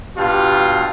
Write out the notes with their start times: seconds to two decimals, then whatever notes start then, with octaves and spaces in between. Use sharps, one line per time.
0.16 G2 B2 F4 G4